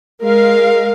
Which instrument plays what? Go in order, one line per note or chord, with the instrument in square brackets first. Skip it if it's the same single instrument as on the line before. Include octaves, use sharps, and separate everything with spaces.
[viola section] G#3 A#4 F5